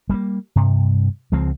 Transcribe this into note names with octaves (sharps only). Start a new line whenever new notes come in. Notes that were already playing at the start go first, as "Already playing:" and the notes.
G3 A3 A#3
G2 C3
C#2 F3 G#3 C4